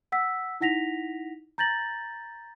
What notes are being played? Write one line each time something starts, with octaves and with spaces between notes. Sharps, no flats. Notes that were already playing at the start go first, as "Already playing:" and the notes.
F#5 E6 B6
D#4 E4 F#5 A#6 B6 F7
A#5 G6 A6 A#6 F#7